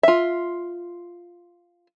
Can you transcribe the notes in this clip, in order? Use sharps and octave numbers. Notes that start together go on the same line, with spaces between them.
F4 E5